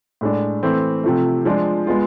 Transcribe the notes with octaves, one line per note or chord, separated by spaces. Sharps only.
A2 G#3 D4
E3 A3 C4
C3 F3 A3
F3 G#3 D4 F4
G#3 B3 F4